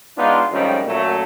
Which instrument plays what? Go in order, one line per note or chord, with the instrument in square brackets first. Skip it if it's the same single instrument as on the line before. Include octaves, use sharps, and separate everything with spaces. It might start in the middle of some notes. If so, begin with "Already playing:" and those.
[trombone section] G#3 B3 D4 D#4 F4
G#1 F2 D#3 G3 A3 C#4
F#2 A#2 F#3 A3